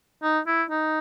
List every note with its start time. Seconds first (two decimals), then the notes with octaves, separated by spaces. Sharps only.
0.23 D#4
0.47 E4
0.70 D#4